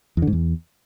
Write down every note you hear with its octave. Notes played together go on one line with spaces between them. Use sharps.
E2
D3
G#2
E2